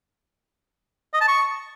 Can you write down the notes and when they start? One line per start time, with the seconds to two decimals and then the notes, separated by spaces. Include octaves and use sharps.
1.14 D#5
1.21 A5
1.28 C#6